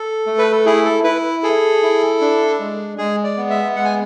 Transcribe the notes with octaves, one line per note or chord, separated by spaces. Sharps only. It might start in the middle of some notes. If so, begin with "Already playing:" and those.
Already playing: A4
A3
B4
A4
E4 G#4
A4
E4 B4
G#4 A4
E4
D4
G#3
G#3 G#4
D5
B3
E5
G#3 F#5
G#5